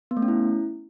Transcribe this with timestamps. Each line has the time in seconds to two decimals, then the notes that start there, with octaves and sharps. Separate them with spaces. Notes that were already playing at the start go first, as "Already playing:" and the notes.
0.11 B3
0.17 A3
0.22 C#4
0.28 E4